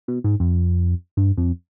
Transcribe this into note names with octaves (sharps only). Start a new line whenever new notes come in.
B2
G#2
F2
G2
F2